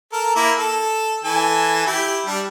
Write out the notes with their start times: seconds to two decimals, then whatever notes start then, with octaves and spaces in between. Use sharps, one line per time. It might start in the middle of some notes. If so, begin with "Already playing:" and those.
0.13 A4 A#4
0.36 A#3 E4
0.58 A4
1.24 E3 A4 G#5
1.86 E4 G4
2.26 G3 D4